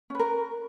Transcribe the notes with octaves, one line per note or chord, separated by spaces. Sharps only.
C#4 A#4 B4